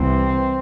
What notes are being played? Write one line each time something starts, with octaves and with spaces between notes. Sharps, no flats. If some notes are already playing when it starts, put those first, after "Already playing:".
Already playing: C2 C3 E3 C4